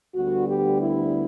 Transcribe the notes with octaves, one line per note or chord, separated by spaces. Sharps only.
D2 D3 G3 B3 F#4
G4
E4